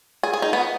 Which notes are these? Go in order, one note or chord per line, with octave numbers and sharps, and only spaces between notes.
G#4
G#4
D#4
B3